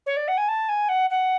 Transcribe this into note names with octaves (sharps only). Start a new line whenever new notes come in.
C#5
D5
F#5
G#5
A5
G#5
F#5
F#5